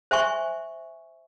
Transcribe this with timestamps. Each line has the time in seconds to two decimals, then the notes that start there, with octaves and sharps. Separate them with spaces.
0.11 C5 E5 G#5 C#6